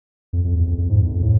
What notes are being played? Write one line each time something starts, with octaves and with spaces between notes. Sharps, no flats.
F2
F2
E2
F2
F2
G#2
E2
F2
A2